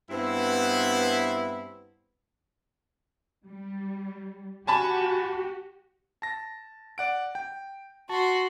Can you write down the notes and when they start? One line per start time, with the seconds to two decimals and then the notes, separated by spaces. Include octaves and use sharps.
0.10 G2 B3 C4 E4
3.46 G3
4.67 F#4 G4 G#5 A5 B5
6.22 A5 A#6
6.98 D5 F#5 D7
7.35 G5
8.10 F#4 A5 C6